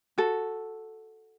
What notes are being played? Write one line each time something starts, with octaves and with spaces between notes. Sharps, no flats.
F#4 A4